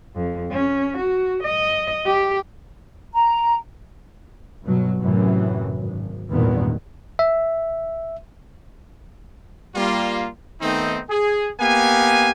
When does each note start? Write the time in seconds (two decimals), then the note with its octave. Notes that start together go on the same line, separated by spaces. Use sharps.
0.15 F2
0.51 C#4
0.98 F#4
1.43 D#5
2.06 G4
3.14 A#5
4.63 G2 B2 F#3
5.01 F#2 A2 C3 E3 F#3
5.78 G#1
6.29 G#1 E2 G2 A#2 D#3 B3
7.19 E5
9.75 G3 A#3 F4
10.61 D#3 A3 B3 C4 D#4
11.09 G#4
11.60 A#3 B3 G4 F5 G#5